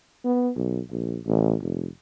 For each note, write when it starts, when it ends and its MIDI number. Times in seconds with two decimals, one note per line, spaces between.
0.24 0.50 59
0.56 0.81 35
0.91 1.18 34
1.26 1.54 33
1.61 1.88 29